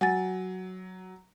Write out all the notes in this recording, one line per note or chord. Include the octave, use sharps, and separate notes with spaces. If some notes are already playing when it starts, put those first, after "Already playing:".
F#3 F#5 G#5 A6